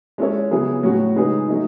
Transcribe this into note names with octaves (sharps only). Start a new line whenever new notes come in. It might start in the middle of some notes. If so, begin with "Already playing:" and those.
G#3 C#4 E4 A4 C#5
C#3 F#3 B3 E4 G#4
A2 F#3 C#4 F#4
C#3 G#3 D#4 G#4 B4
F#3 A3 D#4